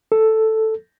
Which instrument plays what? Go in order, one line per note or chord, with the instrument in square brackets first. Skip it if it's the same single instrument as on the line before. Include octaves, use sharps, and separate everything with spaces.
[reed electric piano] A4